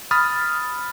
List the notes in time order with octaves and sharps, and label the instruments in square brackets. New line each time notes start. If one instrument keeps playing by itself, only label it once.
[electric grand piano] B5 D#6 F6 A6